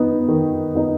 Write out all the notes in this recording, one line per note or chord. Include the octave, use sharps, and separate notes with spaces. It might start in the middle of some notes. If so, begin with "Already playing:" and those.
Already playing: D#3 B3 D#4
D#3
B3 D#4